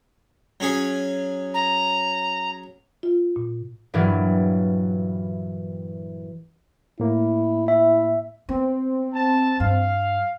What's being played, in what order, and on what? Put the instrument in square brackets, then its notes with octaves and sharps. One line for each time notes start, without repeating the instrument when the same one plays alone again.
[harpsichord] F#3 C#4 G#4
[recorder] A#5
[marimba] F4
A#2
[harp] G2 A#2 E3 F#3 G3
[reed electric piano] A2 A#3 [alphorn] E4
[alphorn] E4 [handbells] E5
[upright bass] B3 [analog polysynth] C4
[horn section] A5
[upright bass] G2 [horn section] F5